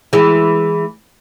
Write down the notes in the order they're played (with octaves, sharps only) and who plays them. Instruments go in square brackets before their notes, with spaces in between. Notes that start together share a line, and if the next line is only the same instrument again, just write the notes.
[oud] E3 G#3